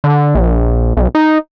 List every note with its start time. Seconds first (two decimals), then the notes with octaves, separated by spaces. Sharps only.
0.04 D3
0.35 A#1
0.97 B1
1.15 D#4